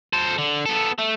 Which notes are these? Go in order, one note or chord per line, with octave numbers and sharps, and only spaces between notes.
A4 C5
D3
B3 A4
A3